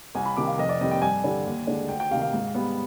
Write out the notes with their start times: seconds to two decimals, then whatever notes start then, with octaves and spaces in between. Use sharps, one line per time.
0.15 C2 G#5
0.26 B5
0.37 C3 D#3 D6
0.47 F5
0.58 F1 D#5
0.69 D5
0.81 D#2 D#3 G3 C4 D#5
0.91 G5
1.02 G2 G#5
1.24 D3 G3 D4
1.45 D#2
1.67 D3 G#3 D4
1.89 D2 G5
2.00 G5
2.11 C3 F5
2.15 D#3
2.22 F5
2.33 G#2
2.55 G3 B3